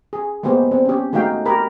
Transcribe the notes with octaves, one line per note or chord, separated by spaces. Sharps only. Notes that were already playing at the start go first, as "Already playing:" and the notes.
G#4
G#3 A#3 B3 G4 C5
C4
C#4 G4
G#3 A3 D#4 F#4 F5 G5
G4 A#4 B5